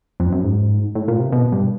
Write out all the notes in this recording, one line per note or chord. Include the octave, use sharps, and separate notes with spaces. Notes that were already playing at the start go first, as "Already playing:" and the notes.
F2
F#2
G#2
A2
A#2
C3
B2
G2